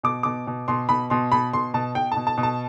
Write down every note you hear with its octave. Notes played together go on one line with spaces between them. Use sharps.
B2 D6
B2 D6
B2
B2 C6
B2 B5
B2 C6
B2 B5
B2 C6
B2 A5
B2 G5
B2 A5
A5
B2
A5